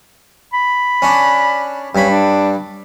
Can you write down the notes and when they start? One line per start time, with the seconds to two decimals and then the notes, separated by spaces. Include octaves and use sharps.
0.53 B5
1.02 C#4 D4
1.95 G2 C#4 B5
2.10 D4